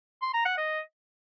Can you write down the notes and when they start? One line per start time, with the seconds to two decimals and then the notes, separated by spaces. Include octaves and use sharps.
0.22 C6
0.34 A#5
0.46 F#5
0.58 D#5